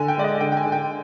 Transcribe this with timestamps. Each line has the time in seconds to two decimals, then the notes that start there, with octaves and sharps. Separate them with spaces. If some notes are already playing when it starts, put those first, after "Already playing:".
Already playing: D3 G#5
0.08 G5
0.17 G#3 D5
0.24 D#5
0.40 D3 G5
0.52 G5
0.57 G#5
0.65 D3
0.72 G5